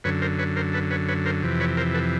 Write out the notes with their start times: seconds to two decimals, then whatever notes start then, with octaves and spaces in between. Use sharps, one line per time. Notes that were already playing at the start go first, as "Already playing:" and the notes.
0.04 F#2 D3 B4 C#5
0.21 A#4 C5
0.39 B4 C#5
0.56 A#4 C5
0.73 A4 B4
0.91 B4 C#5
1.08 B4 C#5
1.26 A#4 C5
1.43 F2 C3 E3
1.60 B4 C#5
1.77 A#4 C5
1.94 A4 B4